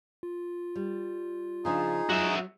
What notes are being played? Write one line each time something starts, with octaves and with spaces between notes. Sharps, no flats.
F4
G3
C#3 F3 D4 D#4 G#4
F#3 F#4 E5